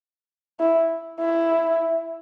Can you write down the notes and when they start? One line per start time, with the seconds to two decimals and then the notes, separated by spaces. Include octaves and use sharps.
0.60 E4
1.20 E4